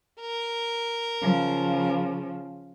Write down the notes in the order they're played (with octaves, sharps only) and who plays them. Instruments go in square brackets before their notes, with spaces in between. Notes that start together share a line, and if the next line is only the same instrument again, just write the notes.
[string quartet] A#4
[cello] C#3 F3